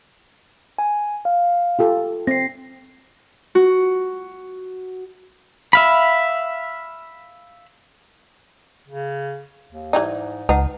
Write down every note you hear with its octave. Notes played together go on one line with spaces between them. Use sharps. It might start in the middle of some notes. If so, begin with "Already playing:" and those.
G#5
F5
F4 G4 A4
C4 A#6 C7
F#4
E5 F5 B5
C#3
D#2
G#2 E3 G3 D#4 D5
C#2 D#4 B4 F#5 A5